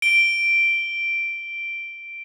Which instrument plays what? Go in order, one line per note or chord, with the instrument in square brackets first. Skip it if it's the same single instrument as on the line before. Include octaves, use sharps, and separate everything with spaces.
[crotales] D7 G7